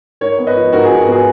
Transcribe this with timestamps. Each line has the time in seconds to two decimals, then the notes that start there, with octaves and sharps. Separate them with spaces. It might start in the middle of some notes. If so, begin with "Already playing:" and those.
0.21 G#2 A#4 C#5
0.38 B3
0.47 B4 D#5
0.55 F3
0.72 G#2 F#4 A#4
0.85 G#4
0.90 G#2
0.98 F#4
1.07 B3
1.12 G#4